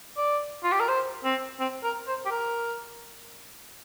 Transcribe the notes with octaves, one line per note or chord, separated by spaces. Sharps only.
D5
F4
G4
A#4
C5
C4
C4
A#4
C5
G4
A#4